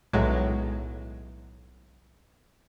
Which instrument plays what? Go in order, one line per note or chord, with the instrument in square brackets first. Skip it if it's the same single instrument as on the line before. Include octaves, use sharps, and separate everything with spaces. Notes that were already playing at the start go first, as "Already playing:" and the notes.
[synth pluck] B1 A2 F#3 G#3